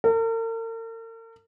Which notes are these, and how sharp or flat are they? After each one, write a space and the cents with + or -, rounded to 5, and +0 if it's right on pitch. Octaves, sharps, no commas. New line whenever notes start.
A#4 -45